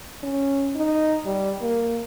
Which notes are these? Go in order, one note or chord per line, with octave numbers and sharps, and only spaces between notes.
C#4
D#4
G3
A#3